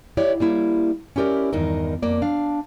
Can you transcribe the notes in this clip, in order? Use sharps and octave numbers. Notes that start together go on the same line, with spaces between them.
E4 G4 C#5 D5
G3 A#3 E4
C#4 E4 G4 A#4 D5
E2 G2 D#3 D#4 A#4
F2 A#3 D5
D4 F5